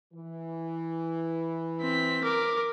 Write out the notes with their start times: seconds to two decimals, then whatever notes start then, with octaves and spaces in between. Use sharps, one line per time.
0.14 E3
1.81 C4 B6
2.23 A#4 D6